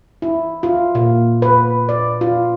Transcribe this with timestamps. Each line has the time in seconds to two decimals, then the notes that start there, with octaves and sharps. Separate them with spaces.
0.22 E4
0.63 F4
0.95 A#2
1.42 B4
1.89 D5
2.21 F4